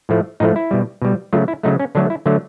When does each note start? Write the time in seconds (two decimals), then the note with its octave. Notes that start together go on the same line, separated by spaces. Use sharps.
0.09 A2 F3 A3
0.40 A2 F3 A3 D#4
0.56 E4
0.71 B2 G3
1.02 B2 G3
1.33 C#3 F#3 A3 F4
1.48 E4
1.63 C#3 F#3 A3 D#4
1.79 C#4
1.95 D3 F#3 A3 D4
2.10 E4
2.26 D3 F#3 A3